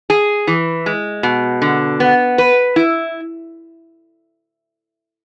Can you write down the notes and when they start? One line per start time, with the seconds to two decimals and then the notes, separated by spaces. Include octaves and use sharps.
0.10 G#4
0.47 E3
0.86 G#3
1.23 B2
1.62 D3
2.00 B3
2.38 B4
2.76 E4